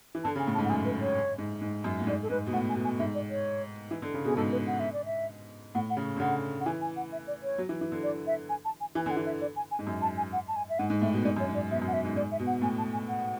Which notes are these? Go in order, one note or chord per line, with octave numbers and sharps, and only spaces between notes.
E3
D3 A5
C#3
G#5
A2
A5
G#2
F#5
F#2 G#5
B4
C#5
G#2
G#2
F#2
A2
G#2 D5
A4
G#2 B4
B2
A2 F#5
G#5
B2
G#5
G#2 E5
D5
C#5
E3
D3
C#3
B2 G#4
G#2 A4
B4
F#5
E5
D5
E5
A2 F#5
F#5
C#3
D3
C#3 F#5
F#5
E3 G#5
G#5
F#5
E5
D5
C#5
F#3
E3
E3
D3
D5
E5
G#5
A5
G#5
E3 G#5
D3 G#5
F#5
E3
E5
D5
G#5
G#5
G#2
F#2
A5
G#5
F#5
A5
G#5
E5
G#2 F#5
G#2
A2 E5
B2
G#2 D5
F#2
C#5
G#2
D5
B2 E5
F#2
F#5
E5
G#2
G#2 D5
E5
B2
F#5
A2 G#5
A5
G#5
F#5